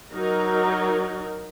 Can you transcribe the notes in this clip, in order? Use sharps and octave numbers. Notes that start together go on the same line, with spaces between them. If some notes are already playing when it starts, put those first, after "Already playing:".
F#3 D#4 A#4